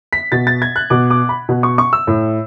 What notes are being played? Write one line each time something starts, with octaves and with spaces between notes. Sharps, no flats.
B6
B2 A6
A6
G#6
F#6
B2 D6
D6
B5
B2
C#6
C#6
E6
A2